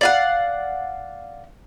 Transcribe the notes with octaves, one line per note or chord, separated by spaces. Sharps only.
D5 F5 F#5